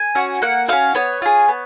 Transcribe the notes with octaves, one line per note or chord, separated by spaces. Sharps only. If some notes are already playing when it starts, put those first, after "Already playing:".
Already playing: G#5
C#4 F#4
A#3 F#5
C#4 F#4 F5
B3 C#5
F4 G#4
B3